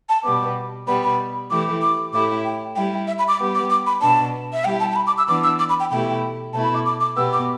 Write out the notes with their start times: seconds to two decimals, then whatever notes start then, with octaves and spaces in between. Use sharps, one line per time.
0.09 A5
0.24 B2 G3 B3 D6
0.87 B2 G3 B3 B5
1.03 B5
1.50 E3 A3 E4 G4 D6
1.82 D6
2.13 A2 A3 E4 G4 D6
2.45 G5
2.75 G3 E4 G4 G5
3.07 E5
3.18 B5
3.28 D6
3.39 G3 B3 G4
3.55 D6
3.70 D6
3.86 B5
4.02 B2 B3 D4 A5
4.53 E5
4.64 G3 E4 G4 G5
4.80 A5
4.91 A5
4.96 B5
5.07 D6
5.18 E6
5.27 E3 B3 D4 D6
5.43 E6
5.59 D6
5.69 B5
5.80 G5
5.91 B2 A3 E4 G4 G5
6.53 B2 A3 E4 A5
6.64 B5
6.74 D6
6.85 D6
7.00 D6
7.16 B2 B3 G4 E6
7.33 D6